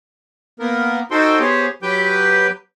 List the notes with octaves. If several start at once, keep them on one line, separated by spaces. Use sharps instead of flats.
A#3 B3 A#4
D#4 F#4 A4 C5 G5 C6
B3 G4 G#4 C5 C#5
F#3 G4 B4 G5 G6